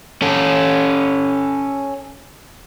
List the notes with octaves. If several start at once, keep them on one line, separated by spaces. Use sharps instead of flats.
C#4 A4